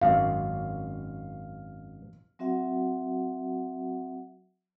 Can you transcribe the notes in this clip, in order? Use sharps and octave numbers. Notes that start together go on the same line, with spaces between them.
G#1 F#2 F5
F#3 C4 F#4 E5 F#5